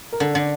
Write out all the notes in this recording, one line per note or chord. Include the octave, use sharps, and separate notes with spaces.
A#4
D3 A4
D3